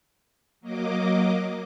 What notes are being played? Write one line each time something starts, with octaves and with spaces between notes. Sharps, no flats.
F#3 A#3 D#5 D6